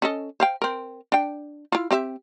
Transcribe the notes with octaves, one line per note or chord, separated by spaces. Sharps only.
C#4 A4 D#5
C5 F5 G5
C4 A#4
D4 G5
E4 F4
C4 G4 E5